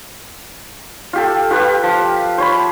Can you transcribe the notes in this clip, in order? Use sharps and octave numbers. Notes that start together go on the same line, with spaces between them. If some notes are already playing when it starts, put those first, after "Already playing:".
F4 G4 A4
F4 G4 B4
F3
C5 C#5 B5